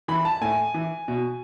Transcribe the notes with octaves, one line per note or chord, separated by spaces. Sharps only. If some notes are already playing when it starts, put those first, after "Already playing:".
E3 B5
A5
A2 G#5
E3
B2